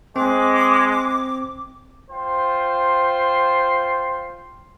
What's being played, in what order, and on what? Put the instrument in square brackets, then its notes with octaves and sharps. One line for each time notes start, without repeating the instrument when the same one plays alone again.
[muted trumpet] G#3 [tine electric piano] C4 [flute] D6
[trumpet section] F4 C5 G5 C6